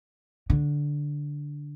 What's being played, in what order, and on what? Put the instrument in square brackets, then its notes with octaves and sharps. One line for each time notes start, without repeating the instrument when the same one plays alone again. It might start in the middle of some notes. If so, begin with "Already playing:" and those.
[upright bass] D3